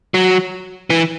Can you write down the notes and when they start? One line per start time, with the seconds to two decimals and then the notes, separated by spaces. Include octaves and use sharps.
0.14 F#3
0.90 E3